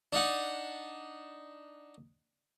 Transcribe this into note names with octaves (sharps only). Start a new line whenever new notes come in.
D4 D#4 F#5